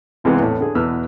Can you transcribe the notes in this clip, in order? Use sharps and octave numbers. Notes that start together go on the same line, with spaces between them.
C#2 C3 E3 G#3 B3 C4
E2 A2
D3 G#4
E2 B2 B4 E6 F6